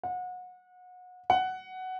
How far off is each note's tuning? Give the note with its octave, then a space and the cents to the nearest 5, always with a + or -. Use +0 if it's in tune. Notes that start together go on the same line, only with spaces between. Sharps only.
F#5 -30
F#5 +10